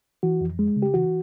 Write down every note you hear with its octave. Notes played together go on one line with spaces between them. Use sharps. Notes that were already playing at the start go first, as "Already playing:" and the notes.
E3 F#4
F2
G#3
C#3
G4
E3 F#4